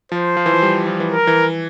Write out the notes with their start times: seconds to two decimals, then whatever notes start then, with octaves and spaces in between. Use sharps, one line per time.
0.12 F3 C5
0.37 F3
0.46 E3
0.54 F3
0.62 G3
0.87 F3
1.00 E3
1.12 A#4
1.27 E3